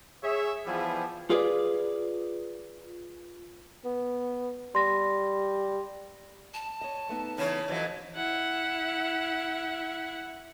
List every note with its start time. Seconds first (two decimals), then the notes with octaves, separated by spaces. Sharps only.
0.22 G#4 C#5 E5
0.66 E3 F3 G3 B3 E4 G#4
1.30 F4 G#4 B4 D5
3.84 B3
4.75 G3 C6 A#6
6.54 A5
6.81 C#5 D#5
7.09 A3 B3 D#4
7.38 C#3 E3 C#5
7.68 F2 E3 F#3
8.16 E4 F#5